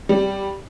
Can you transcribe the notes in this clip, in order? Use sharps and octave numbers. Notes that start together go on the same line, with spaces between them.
G3